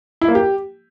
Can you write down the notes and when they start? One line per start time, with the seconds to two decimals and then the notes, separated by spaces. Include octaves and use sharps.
0.21 E4
0.28 A#3
0.35 G4